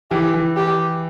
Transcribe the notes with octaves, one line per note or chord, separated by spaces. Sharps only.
E3 G4
E3
G4